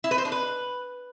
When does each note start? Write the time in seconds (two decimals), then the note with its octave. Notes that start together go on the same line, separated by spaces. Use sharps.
0.04 E4
0.11 B4
0.18 C5
0.25 D4
0.32 B4